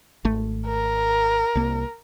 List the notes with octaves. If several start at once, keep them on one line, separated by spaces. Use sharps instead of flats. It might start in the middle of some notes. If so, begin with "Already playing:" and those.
G#1 A3
A#4
C2 A#3